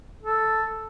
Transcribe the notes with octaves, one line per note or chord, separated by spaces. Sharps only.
A4